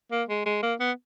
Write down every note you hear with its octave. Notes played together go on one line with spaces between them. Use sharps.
A#3
G#3
G#3
A#3
B3